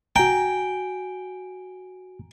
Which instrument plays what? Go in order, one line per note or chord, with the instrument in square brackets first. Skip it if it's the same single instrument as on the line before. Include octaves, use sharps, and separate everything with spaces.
[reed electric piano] F#4 G#5 A#5 [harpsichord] G5